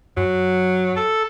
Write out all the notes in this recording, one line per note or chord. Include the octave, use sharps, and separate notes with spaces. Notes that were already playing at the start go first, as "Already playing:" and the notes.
F#2 F#3
A4